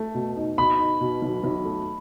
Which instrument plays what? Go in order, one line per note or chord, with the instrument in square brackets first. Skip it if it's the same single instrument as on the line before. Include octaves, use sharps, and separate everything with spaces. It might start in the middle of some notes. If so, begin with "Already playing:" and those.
Already playing: [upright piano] A3
B2
D#4
[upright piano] B2 [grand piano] B5
[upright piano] D#4
B2
B1
B1
A3